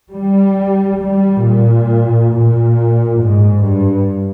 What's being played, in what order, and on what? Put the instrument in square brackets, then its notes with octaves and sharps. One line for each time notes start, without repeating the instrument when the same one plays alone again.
[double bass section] G3
G3
A#2
A#2
G#2
G2